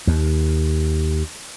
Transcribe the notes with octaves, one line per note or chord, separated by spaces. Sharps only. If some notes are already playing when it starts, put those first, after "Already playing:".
D#2